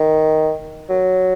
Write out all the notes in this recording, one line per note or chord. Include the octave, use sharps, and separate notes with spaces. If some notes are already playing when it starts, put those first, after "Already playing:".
Already playing: D#3
F#3